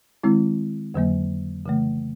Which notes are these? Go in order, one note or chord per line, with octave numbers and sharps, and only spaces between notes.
D#3 G#3 C4 E4
F2 D3 F#3 A#3
C#3 E3 A3